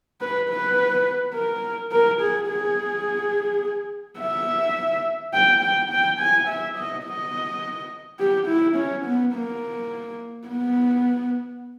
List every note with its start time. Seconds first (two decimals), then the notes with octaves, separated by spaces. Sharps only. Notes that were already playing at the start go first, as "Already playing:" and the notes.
0.21 B4
0.49 B4
1.34 A#4
1.92 A#4
2.21 G#4
2.49 G#4
4.20 E5
5.33 G5
5.62 G5
5.90 G5
6.20 G#5
6.48 E5
6.77 D#5
7.04 D#5
8.19 G4
8.47 E4
8.76 C#4
9.05 B3
9.33 A#3
10.47 B3